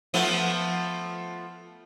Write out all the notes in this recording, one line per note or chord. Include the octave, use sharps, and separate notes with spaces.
F3 A3 B3